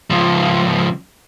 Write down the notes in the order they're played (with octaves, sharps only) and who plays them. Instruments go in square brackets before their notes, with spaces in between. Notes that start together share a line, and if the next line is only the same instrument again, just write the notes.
[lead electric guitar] C#2 F3